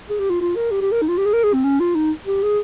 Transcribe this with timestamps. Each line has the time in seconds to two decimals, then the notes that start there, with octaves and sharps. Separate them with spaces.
0.10 G#4
0.19 G4
0.30 F4
0.41 F4
0.56 A#4
0.71 G4
0.81 G4
0.92 A#4
1.02 D#4
1.08 F4
1.18 G4
1.25 G#4
1.33 A#4
1.44 G#4
1.54 C4
1.64 C#4
1.80 F4
1.95 D#4
2.26 G4
2.43 G#4